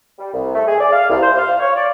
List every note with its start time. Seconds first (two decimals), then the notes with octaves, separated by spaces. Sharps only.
0.19 G3
0.34 C2
0.55 A3
0.67 G#4
0.80 D5
0.92 F5
1.10 C2
1.22 C5
1.37 F5
1.60 C#5
1.76 D5